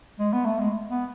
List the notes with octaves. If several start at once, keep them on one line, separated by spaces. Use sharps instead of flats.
G#3
B3
A3
G#3
B3